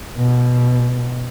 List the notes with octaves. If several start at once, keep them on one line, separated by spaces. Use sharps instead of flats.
B2